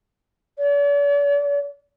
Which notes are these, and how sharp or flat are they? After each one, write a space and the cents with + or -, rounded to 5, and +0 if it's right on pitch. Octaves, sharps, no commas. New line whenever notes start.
D5 -45